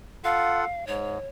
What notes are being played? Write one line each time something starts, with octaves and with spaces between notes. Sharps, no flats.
F4 A4 F5 F#5
G#2 C#5